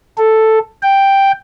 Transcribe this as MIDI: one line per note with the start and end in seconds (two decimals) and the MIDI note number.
0.18 0.59 69
0.83 1.32 79